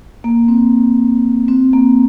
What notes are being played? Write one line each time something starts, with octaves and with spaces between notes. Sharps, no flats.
A#3
C4
C4
A#3